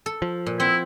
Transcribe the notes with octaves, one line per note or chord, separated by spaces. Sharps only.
A4
F3
A#2
C4 E4 F#5